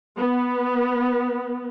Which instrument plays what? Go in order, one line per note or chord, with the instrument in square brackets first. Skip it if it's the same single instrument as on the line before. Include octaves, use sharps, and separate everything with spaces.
[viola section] B3